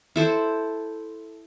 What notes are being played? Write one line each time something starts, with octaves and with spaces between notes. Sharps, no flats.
E4 A4 C5